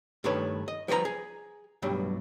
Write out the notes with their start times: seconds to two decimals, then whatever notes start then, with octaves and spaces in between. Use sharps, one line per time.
0.24 G2 D#3 A3 B4 C#5
0.68 D#5
0.88 F3 G3 B4 C#5 A#5
1.05 G#4
1.82 B1 G2 F#3 G3